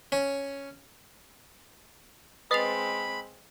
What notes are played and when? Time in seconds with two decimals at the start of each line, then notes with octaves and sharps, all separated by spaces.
0.12 C#4
2.51 G#3 C4 B4 D#5 B5 A6 C7 F7